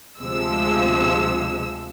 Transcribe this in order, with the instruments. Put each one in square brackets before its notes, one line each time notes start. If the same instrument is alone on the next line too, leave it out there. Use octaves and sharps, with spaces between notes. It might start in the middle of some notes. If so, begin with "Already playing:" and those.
[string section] D2 C3 F3 G#3 E6